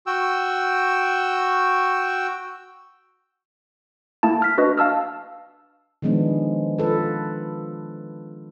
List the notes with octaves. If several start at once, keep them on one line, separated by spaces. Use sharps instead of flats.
F#4 G5 E6
A3 A#3 E4 A5
F6 B6
D4 F#4 B4 D#5
F5 A5 E6 F6
D#3 F3 G#3 B3 D4
F4 A4 B4